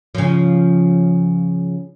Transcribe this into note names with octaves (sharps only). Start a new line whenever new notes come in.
C#3 F3